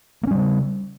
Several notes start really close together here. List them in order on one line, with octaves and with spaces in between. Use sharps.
A#3 C#4 G3 C#3